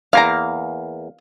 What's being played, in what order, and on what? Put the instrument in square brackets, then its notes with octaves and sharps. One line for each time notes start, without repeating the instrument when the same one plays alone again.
[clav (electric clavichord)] E2 A#3 [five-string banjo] F5 A#5